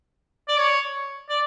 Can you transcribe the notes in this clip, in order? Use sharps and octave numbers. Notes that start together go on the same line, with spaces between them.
D5
C#5
D5